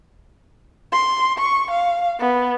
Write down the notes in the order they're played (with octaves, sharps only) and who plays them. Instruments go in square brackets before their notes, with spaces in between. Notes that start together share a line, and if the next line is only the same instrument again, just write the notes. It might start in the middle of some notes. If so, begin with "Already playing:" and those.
[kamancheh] C6
C#6
F5
B3